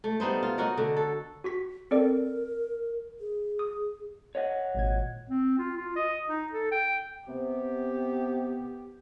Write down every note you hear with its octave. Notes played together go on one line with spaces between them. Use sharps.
A3
G3 B3 D#4 C5
F4
D#4 F#4 A#4 C#5
D3
A4
F#4 C#6 B6
C4 A4 A#4 D5
G#4
D#6
C#5 D#5 F#5
G#1 A#2 G#6
C4
F4
F4
D#5
D#4
A4
G5
C3 B3 G4